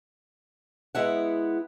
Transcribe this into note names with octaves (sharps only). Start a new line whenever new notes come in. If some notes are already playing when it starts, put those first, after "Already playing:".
G#3 B3 E4 F#5